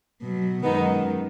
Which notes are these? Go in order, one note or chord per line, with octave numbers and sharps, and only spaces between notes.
B2 F#3
F#2 D#3 G#3 B3 D#4